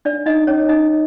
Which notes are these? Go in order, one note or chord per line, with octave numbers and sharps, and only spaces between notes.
D4 D5
D#4 D#5
C#4 C#5
D#4 D#5